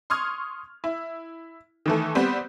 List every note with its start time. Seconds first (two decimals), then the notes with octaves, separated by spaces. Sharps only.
0.10 C6 C#6 D#6 F6 G#6
0.84 E4
1.86 D#3 E3 A3
2.15 G3 B3 C4